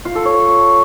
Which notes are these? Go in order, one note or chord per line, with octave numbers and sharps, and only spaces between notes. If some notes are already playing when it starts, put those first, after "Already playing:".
F4
A4
C#5